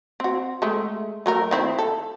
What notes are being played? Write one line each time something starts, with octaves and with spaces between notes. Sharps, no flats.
C4 F#4
G#3 A3
F#3 A3 A#4
D#3 C4 E4
A4